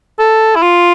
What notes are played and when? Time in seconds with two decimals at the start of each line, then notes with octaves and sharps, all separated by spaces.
0.19 A4
0.56 E4
0.62 F4